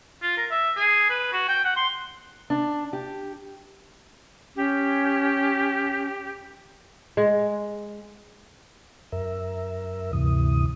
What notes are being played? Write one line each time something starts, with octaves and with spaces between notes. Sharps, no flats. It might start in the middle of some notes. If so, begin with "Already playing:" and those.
F4
A#4
E5
G#4
B4
F#4
G5
F#5
C6
D4
G4
C#4 G4
G#3
F#2 A#4 E5
D2 G2 C3 E3 D#6